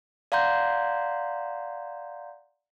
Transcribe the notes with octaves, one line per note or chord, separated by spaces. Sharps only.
D5 F5 F#5 A#5 C6 G6